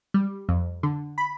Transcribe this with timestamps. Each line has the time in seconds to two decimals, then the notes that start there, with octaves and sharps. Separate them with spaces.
0.14 G3
0.49 F2
0.83 D3
1.18 B5